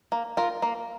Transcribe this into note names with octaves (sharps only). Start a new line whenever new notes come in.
A#3
F4 A#4
A#3